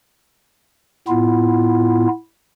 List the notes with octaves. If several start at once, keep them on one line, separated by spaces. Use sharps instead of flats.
A2 B3 E4 F4